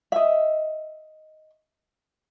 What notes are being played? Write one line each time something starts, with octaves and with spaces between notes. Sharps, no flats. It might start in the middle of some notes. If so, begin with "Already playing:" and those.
D#5 E5